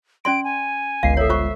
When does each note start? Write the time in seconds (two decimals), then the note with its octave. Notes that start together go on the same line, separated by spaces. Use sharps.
0.25 C#4 D5 C6 D7
0.44 G#5
1.03 G1 C#2 F5 C7
1.17 A4 C#5 E5
1.29 F4 C5 C#6